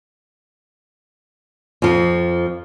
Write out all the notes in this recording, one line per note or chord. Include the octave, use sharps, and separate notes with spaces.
F2 F3